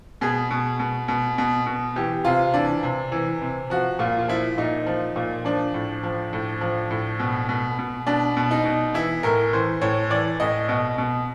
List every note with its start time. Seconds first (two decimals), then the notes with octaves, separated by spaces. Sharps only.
0.21 B2 G#4
0.51 B2
0.79 B2
1.08 B2
1.38 B2
1.66 B2
1.96 E3 G4
2.25 C3 F4
2.54 E3 D4
2.83 C3
3.12 E3
3.42 C3
3.70 F3 F#4
3.99 A#2 F4
4.19 F4
4.28 F3 E4
4.58 A#2 D#4
4.87 F3
5.16 A#2
5.45 F3 D4
5.74 A2
6.03 F3
6.33 A2
6.61 F3
6.91 A2
7.19 B2
7.49 B2
7.79 B2
8.07 B2 D4
8.37 B2
8.51 D#4
8.65 B2
8.94 E3 E4
9.23 A2 A#4
9.53 E3 C5
9.81 A2 C#5
10.10 E3 D5
10.40 A2 D#5
10.69 B2 D#5
10.98 B2